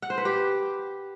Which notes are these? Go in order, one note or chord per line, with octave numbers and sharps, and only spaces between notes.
F#5
C5
B4
G4